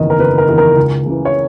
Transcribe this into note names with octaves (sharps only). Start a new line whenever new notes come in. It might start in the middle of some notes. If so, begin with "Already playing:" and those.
Already playing: F#1 E2 D#3 D#5
A#4
F#1 B4
A#4
E2 D#3
A#4
C#2
C#3 E3
C#5